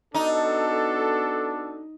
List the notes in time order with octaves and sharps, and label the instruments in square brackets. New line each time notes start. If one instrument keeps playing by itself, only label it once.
[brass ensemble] B3 F#4 A4 [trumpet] D4 [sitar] D#4